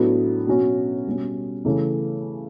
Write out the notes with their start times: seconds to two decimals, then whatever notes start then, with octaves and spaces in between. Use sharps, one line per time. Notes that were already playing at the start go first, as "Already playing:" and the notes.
Already playing: A2 F#3 B3 D4 F#4
0.46 B2 F#3 C#4 F#4
1.06 B2 G3 C#4
1.65 C#3 E3 A3